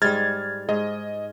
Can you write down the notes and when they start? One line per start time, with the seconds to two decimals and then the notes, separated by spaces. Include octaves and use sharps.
0.02 G#2 G3 F6 G#6 A6
0.69 G#2 D#5